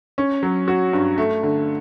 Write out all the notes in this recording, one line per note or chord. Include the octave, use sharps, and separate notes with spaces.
C#4
F#3
F#4
G2
A3
D3